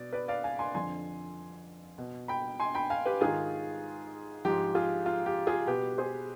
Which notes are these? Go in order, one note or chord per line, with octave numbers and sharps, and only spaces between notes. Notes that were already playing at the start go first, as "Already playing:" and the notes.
Already playing: B2 D5
B4 D5
D5 F5
F5 G#5
G#5 C6
F2 D3 F3 G#5 C6
B2
G5 B5
G#5 C6
G5 B5
F5 G#5
G4 B4
G#2 D#3 F4 G#4
G#2 F3 G4
F4 G#4
F4
G4
F4 G#4
B2 G4 B4
G#4 C5